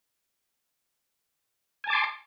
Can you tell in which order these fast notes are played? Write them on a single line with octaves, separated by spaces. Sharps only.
G#5 A5 D6 C6